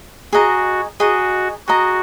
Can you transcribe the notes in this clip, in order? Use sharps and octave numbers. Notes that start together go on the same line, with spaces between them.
F#4 G#4 D#5 A#5
F#4 G#4 D#5 A#5
F#4 G#4 D#5 A#5